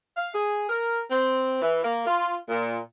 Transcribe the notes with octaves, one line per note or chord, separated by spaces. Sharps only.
F5
G#4
A#4
C4
E3
A#3
F4
A#2